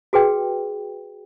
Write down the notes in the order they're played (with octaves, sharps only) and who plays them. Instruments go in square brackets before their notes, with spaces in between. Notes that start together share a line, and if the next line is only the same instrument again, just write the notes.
[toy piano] F#4 G#4 B4 G5